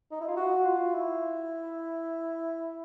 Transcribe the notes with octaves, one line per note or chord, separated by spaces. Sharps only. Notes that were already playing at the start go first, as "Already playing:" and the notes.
D#4
E4
F4
F#4
F4
E4